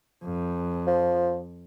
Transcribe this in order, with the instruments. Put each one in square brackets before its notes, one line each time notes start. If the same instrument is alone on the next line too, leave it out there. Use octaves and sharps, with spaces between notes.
[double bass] F2
[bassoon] F3